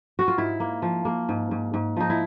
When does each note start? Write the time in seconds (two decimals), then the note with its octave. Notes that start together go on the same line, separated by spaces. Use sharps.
0.19 F#4
0.28 F4
0.38 G#2 E4
0.60 A#3
0.82 F3
1.05 A#3
1.29 G#2
1.51 G#2
1.74 G#2
1.97 F3 D#4
2.10 E4